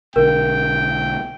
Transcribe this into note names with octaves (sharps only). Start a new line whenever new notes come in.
B1 D3 A#4 G5